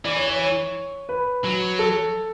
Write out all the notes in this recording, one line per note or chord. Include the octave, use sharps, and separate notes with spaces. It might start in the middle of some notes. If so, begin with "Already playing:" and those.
E3 D5
C#5
C#5
C#5
B4
F#3
A4